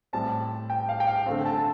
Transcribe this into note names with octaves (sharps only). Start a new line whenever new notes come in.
A2 G3 C4 A5
G5
F5
G5
F5
D3 A3 C4
A5
A5